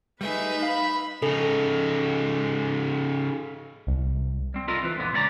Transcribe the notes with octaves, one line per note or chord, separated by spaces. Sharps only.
G3 A3 D#4 G#4 B4 E5
F5 B5
C#3 D#4 A4
C2
G3 C4
E4 F4 A4 A#4 D5 D#5
E3 C4 B4
F2 A#2 D3 B3
C#2 E3 C#4 D4 D5 A#5